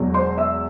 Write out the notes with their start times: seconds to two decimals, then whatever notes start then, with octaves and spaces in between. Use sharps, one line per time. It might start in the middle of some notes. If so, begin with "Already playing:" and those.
Already playing: E1 E2 B2 F#3
0.14 C5 C6
0.38 E5 E6